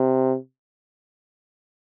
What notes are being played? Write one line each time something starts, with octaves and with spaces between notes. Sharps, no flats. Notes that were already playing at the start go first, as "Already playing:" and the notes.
Already playing: C3